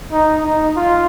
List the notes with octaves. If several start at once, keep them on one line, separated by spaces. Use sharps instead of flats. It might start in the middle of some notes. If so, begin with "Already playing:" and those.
D#4
D#4
F4